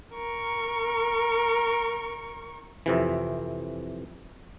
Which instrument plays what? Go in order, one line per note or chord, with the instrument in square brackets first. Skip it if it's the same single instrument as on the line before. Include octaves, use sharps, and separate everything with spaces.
[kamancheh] A#4 C#6
[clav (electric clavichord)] F2 C3 E3